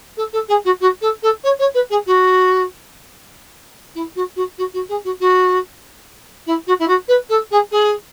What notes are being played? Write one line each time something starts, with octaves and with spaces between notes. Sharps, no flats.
A4
A4
G#4
F#4
F#4
A4
A4
C#5
C#5
B4
G#4
F#4
E4
F#4
F#4
F#4
F#4
G#4
F#4
F#4
E4
F#4
E4
F#4
B4
A4
G#4
G#4